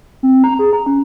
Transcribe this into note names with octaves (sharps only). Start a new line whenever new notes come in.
C4
A#5
G#4
A#5
C#4